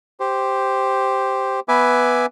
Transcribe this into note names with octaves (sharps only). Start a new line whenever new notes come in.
G4 C5
B3 B4 E5 G#5 D6